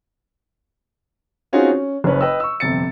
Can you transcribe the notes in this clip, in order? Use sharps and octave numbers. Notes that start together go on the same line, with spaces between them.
C4 C#4 D#4 F4 F#4 G#4
C#4
F#1 C#3 C#4 B4
B4 D#5 G5 E6
C#6 E6
G1 F2 C3 A6 C#7